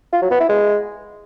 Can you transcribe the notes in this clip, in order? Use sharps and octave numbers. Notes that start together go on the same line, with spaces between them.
F4
F#3
B3
E4
G#3